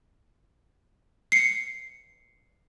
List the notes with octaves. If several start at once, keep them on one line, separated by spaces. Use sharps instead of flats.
C7 C#7